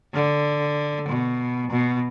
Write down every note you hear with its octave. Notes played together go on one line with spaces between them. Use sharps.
D3
B2
B2